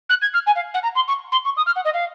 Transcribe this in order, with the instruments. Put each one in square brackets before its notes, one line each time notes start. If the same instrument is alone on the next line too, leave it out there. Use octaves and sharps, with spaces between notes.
[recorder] F#6
G#6
F6
G#5
F5
F#5
A#5
C6
C#6
C6
C#6
D#6
F6
F#5
D#5
F5